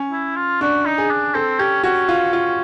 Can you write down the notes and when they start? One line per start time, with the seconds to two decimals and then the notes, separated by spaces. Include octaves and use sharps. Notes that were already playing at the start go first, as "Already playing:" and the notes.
Already playing: C#4
0.11 E4
0.36 F4
0.61 D4 F#4
0.85 D#4
0.98 G#4
1.11 D4
1.34 C4 A4
1.59 C#4 G4
1.83 C#4 F#4
2.09 F4
2.33 F4